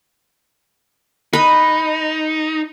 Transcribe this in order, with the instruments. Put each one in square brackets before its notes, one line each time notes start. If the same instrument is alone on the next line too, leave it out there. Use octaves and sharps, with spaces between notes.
[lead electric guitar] D#4 [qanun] B4 B5